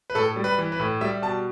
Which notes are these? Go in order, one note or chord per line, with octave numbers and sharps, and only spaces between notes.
B4
A2 A4
G3
B4
E3
B4
A2
G3 E5
B2 A5